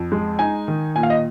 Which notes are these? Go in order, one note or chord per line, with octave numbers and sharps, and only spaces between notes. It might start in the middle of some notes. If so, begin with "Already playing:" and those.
Already playing: F2
G#3
D#4 G#5
D#3
A#2 G#5
F5
D#5